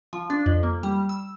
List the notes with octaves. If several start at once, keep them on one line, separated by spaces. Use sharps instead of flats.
F3
D4
F2
A#3
G3
E6